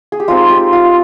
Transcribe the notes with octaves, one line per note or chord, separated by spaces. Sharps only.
G#4
G4
G#3 C4 D#4 F4
G4
F4